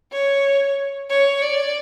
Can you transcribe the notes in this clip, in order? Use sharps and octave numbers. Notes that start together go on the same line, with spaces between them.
C#5
C#5
D5